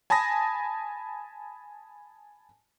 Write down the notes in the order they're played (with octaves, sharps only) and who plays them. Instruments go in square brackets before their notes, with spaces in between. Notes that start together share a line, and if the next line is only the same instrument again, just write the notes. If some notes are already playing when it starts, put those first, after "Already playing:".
[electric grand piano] G#5 A5 B5 D#6 A#6